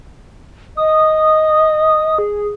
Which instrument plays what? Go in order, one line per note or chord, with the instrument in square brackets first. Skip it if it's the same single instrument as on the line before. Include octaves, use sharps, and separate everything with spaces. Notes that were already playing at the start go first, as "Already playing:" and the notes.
[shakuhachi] D#5 [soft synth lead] D#6
[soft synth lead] G#4